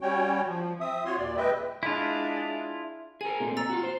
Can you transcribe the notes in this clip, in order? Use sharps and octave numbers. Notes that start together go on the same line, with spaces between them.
G3 C#4 F#4 C#5 G5
F3
C4 E5 D#6
F4 F#4 C#5 C6
D#2 A#2 D5
G#3 B4 D#5 E5 G5
G#3 D4 E4 F4
G#4 A#4 G#5
A#2 A3 C4
A#5 E6 A6
F4 F#4
C5